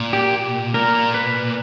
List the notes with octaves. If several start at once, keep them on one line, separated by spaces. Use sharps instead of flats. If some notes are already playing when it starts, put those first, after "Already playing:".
Already playing: A#2
G4
A#2 A#4
B4